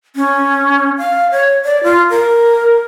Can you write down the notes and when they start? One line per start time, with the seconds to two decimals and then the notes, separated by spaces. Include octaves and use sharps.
0.16 C#4
0.98 F5
1.31 C#5
1.65 D5
1.84 F4
2.10 A#4